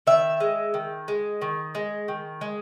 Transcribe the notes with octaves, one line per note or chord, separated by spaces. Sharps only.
D#3 E5
G#3
D#3
G#3
D#3
G#3
D#3
G#3